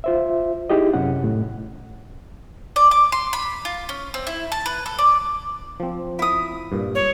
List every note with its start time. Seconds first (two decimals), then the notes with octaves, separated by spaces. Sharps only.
0.04 F4 C5 E5
0.70 D#4 E4 G4 G#4 D#5
0.94 F#2 C3 C#4 F#5
1.24 A2
2.76 D5
2.91 D6
3.12 C6
3.33 B5
3.65 F4
3.89 C#4
4.14 C4
4.27 E4
4.52 A5
4.66 B4
4.86 A4
4.99 D5
5.80 F3 C4
6.19 E4 D#6
6.72 G2 A#2
6.95 C#5